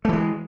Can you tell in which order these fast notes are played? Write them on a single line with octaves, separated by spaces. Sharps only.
A3 E3 G#3